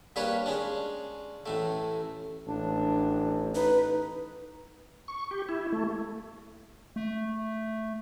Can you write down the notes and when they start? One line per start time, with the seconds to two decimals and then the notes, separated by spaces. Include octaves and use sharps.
0.16 G3 A#3 D4 G4 B4 C#5
0.46 G#3 C#4 D4
1.46 A1 A2 A3
2.47 A1 D4
3.55 D#4 B4
5.08 C#6
5.31 G4
5.49 E4
5.72 A3
6.96 A3